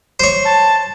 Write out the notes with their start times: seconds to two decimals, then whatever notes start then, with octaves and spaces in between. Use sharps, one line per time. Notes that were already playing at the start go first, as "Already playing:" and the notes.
0.20 C5 C#5
0.45 A5